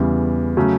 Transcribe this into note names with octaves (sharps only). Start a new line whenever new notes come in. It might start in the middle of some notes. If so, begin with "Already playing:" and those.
Already playing: E2 C#3 E3 G3
C#3 F#3 A3 C#4